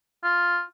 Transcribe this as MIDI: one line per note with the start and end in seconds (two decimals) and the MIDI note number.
0.24 0.61 65